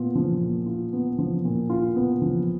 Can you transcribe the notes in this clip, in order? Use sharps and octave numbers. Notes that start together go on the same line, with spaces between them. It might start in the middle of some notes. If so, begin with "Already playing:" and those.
Already playing: A#2 B3 F4
F3
A#2
F4
B3
F3
A#2
F4
B3
F3